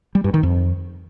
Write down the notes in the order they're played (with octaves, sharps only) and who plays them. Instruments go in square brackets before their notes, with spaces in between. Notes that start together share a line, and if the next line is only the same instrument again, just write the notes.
[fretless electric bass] G3
G2
D#3
F2